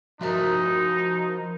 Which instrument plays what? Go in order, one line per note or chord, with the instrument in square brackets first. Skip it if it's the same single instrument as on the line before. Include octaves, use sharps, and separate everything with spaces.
[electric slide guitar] F3 E5 A#5 [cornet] D#4 [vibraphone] F#4 A#4